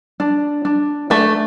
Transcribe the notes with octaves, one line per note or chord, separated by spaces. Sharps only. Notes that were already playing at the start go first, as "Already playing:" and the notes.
D4
D4
A3 D4